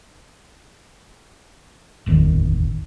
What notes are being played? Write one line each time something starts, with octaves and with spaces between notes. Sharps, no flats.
D1 G1 E2 D#3